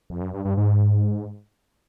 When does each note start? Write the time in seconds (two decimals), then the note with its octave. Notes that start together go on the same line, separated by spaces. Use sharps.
0.10 F2
0.21 F#2
0.34 G2
0.45 G2
0.57 G#2